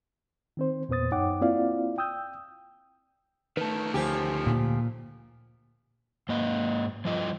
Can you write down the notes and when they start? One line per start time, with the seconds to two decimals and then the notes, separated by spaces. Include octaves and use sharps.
0.57 D#3 C4 C5
0.89 E2 A#2 B3 C5 D#6 A6
1.12 F#2 D#4 C#5 F#5 G5 D6
1.41 A#3 C4 E4 F4 D5 F5
1.98 G5 D#6 E6 G6
3.57 D#3 A3 B4 A5
3.94 D2 F3 G4 G#5
4.47 A#2
6.29 G#2 A#3 D#5
7.05 F3 G3 F4 D#5